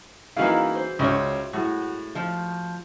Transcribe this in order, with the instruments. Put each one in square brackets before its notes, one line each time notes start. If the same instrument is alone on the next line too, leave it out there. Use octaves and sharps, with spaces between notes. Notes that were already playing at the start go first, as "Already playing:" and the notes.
[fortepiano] E3 E4 [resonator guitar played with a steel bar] A#3 D#4 F5 [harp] C#4 F#4 G#4
[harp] C5
[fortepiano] C#2 [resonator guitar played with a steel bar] C#4 C#5 [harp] E5 G5 C6
[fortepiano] A2 [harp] A3 G#4 [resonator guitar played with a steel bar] F#4
[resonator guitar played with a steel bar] F3